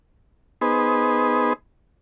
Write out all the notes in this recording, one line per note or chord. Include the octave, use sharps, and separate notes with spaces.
B3 D#4 G#4 B4 C5